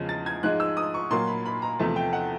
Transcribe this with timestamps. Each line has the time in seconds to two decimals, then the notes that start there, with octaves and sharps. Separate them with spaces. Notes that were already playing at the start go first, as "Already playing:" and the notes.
Already playing: E2 C#3 F3 G#3
0.09 A6
0.26 G#6
0.43 G#2 F3 G#3 F#6
0.60 E6
0.77 D#6
0.94 C#6
1.11 A#2 F#3 A#3 C6
1.27 B5
1.46 B5
1.62 A#5
1.79 E2 C3 F3 A3 A5
1.96 G5
2.13 F#5